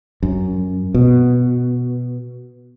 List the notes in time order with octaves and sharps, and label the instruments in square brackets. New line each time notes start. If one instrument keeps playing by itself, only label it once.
[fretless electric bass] F#2
B2